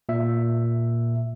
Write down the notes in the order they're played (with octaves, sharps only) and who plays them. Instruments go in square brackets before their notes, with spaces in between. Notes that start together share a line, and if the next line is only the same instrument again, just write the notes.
[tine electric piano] A#2 E5